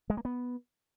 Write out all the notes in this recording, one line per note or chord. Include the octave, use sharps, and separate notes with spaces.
G#3
A#3
B3